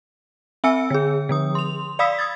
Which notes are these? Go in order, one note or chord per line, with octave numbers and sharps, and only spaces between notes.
C4 E5 G#5 E6 C#7
D3 G#4
D3 F3 D#6
C6 F7
D5 F5 B5 D#6 E6 B6
D#6 G#6 A6